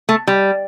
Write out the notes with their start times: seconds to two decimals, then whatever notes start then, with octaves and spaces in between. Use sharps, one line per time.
0.09 A3
0.27 G3